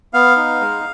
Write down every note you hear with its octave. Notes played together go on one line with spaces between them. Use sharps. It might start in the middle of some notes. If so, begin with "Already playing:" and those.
B3 F5
D#4
G#3